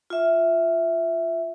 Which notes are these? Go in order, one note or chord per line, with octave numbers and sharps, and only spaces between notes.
F4 E5